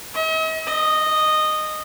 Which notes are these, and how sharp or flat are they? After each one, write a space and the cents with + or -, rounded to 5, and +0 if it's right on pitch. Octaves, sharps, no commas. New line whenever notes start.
D#5 +45
D#5 -10